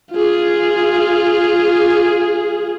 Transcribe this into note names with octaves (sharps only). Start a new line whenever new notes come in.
F4 G#4